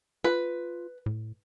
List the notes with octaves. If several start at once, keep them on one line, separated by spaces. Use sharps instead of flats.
F4 B4
A2